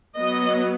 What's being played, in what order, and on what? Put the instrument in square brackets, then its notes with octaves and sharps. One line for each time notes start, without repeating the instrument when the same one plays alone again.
[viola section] F#3 B3 D#5